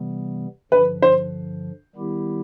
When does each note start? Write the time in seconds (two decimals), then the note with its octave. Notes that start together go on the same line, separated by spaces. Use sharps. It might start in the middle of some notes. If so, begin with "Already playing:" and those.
Already playing: C3 E3 G3 B3
0.71 G2 D3 F3 B4
1.02 C5
1.96 D#3 G3 B3 E4 G4